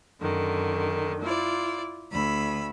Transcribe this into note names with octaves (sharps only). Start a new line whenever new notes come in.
F#2 D3 D#3
E4 F4 D5
D2 B5 E6